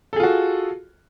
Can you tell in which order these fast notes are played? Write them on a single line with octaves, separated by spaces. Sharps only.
A4 G#4 F4 F#4